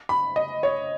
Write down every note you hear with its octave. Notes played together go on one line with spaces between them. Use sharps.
B5
D#5
C#5